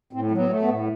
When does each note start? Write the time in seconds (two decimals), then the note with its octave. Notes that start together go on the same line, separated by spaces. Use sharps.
0.13 A2 C4
0.31 F#3
0.38 B3
0.49 A3
0.62 B3
0.68 A2